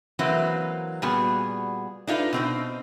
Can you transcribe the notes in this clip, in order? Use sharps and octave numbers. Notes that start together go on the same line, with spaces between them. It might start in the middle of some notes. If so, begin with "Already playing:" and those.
E3 F#3 A#3 C4 B4
A#2 G3 B3 F#4 G#4
D4 D#4 F4 A4 B4
B2 C4 D#4